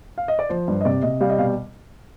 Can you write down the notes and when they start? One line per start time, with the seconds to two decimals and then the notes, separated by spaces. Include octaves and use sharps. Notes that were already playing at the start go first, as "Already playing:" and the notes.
0.18 F5
0.28 D#5
0.39 D5
0.49 F3 C5
0.68 G2
0.81 D#5
0.85 C3 D5
1.02 C3 D#5
1.21 G3 F5
1.30 D#5
1.38 B2 F5